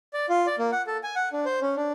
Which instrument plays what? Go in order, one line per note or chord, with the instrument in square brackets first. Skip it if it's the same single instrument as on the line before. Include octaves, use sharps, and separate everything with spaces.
[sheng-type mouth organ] D5
F4
D5
A#3
F#5
A4
G#5
F#5
D4
C5
C#4
D4